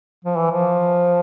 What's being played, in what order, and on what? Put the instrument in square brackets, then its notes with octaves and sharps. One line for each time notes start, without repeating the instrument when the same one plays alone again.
[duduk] F3
E3
F3